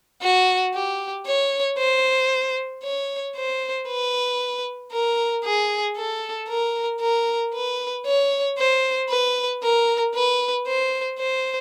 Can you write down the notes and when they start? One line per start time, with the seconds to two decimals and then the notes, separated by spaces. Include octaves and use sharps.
0.22 F#4
0.74 G4
1.27 C#5
1.78 C5
2.83 C#5
3.36 C5
3.88 B4
4.92 A#4
5.45 G#4
5.97 A4
6.49 A#4
7.01 A#4
7.54 B4
8.06 C#5
8.58 C5
9.09 B4
9.63 A#4
10.14 B4
10.67 C5
11.19 C5